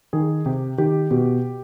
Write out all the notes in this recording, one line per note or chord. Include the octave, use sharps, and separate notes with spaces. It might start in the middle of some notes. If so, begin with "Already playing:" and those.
D#3 G#4
C3 G4
D#3 G4
B2 G4